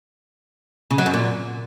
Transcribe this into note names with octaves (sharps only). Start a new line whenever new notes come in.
C#3
F#3
F#2
A#2